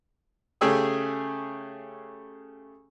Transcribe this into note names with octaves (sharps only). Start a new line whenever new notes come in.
C#3 A3 G4 G#4 C#5 E6